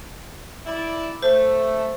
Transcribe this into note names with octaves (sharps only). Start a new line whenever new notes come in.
E4 D5
A3 C5